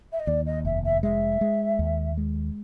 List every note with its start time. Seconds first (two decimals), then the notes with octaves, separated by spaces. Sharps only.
0.12 E5
0.19 D#5
0.27 D#2 D5
0.46 D#5
0.65 F1 E5
0.84 E5
1.03 G#3 E5
1.41 G#3
1.79 D#2
2.17 G#3